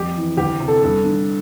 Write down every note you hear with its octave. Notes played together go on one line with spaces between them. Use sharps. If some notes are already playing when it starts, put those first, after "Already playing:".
Already playing: F2 G4
E3
D2 G4
C3
A4
G2 A4
D3